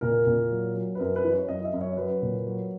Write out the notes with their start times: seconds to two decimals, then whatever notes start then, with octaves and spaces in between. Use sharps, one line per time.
0.01 A#2 A#4
0.27 A#2
0.51 F#3
0.75 F#3
0.95 B4
0.99 F#2 A#4
1.16 B4
1.24 E3
1.33 C#5
1.49 F#2 D#5
1.65 E5
1.74 F#2
1.81 C#5
1.97 F#3 B4
2.22 A#2
2.47 F#3